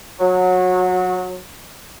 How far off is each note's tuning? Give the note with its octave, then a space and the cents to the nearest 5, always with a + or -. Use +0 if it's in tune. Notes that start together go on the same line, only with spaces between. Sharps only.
F#3 -20